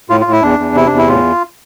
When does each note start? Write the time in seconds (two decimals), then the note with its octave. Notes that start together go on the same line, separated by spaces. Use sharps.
0.10 A2 F4
0.21 F4
0.26 A2
0.32 E4
0.42 E2 D4
0.59 E2
0.75 C3 E4
0.87 D4
0.92 E2
0.97 E4
1.07 A2 F4